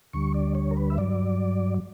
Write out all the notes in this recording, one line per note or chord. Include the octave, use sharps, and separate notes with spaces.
D2 D3 G3 C#6
D5
C#5
A#4
B4
E5
G2 F#3 D5